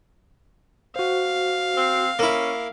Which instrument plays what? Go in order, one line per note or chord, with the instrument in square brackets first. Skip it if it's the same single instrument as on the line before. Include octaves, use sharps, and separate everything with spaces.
[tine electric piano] F#4 C5 [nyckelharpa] F5
[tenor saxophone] C4
[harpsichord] A#3 E4 [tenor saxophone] C#4